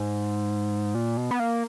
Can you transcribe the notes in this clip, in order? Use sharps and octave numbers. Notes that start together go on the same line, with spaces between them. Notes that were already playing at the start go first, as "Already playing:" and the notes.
Already playing: G#2
A#2
B2
B3
A#3